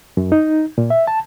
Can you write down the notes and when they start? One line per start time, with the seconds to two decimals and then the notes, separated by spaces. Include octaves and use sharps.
0.17 F#2
0.32 D#4
0.78 A#2
0.90 E5
1.07 A5